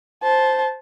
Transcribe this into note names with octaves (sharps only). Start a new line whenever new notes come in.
C5 A5